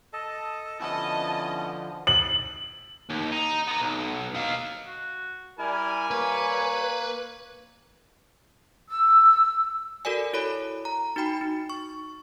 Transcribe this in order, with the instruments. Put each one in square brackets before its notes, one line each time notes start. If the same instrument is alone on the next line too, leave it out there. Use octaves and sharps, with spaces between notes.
[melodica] A4 D#5 A5
[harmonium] D3 F3 [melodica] B3 C#4 E4 [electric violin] D#5 A5
[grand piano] F#7
[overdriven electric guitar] D#2
D#4
B3 A#5
B1
D#4 F5
[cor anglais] F#4
[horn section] G3 G#5 [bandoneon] E4 [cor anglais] A#4
[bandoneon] A#3 [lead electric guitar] B4 [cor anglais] C#5
[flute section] E6
[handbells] F#4 A4 A#4 D5 G#5
E4 A4 C#5 B5
A#5
D#4 F#4 G5 B5
D#4
C#6